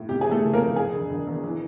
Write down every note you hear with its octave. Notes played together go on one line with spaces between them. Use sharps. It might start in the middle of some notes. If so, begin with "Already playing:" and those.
Already playing: A2
C3 G4
E3 G#4
A3 A4
F#1
A#3 A#4
F2
C3 G#4
E1
E1
E2
E3